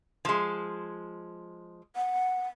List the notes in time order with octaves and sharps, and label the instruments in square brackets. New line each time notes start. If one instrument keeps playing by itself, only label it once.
[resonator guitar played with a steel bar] F3 G#3
[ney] F#5